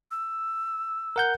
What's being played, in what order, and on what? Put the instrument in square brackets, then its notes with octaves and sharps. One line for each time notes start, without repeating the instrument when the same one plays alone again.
[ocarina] E6
[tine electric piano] A#4 F#5 G6